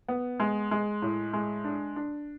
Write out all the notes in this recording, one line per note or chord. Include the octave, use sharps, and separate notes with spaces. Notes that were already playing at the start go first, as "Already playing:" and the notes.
B3
G#3
G#3
A2
G#3
D4
D4